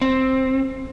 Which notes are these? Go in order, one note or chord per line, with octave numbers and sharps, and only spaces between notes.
C4